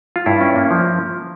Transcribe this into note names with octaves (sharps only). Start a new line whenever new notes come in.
F4
G2 E4
C#4
A#3
F3